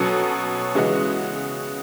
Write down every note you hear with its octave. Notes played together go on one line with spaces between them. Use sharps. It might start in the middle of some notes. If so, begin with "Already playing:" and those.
Already playing: B2 F#3 C#4 F#4 A4
C#3 E3 G#3 C#4 F#4